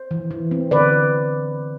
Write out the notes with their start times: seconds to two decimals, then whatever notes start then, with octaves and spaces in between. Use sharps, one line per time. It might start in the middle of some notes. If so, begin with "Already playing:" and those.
Already playing: C5
0.11 E3
0.31 E3
0.51 C4
0.71 D3 B4 D5